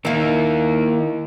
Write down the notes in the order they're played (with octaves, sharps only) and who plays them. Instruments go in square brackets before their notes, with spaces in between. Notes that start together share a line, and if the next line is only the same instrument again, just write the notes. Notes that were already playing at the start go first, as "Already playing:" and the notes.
[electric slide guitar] D#3 A#3 D#4 [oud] E4 F5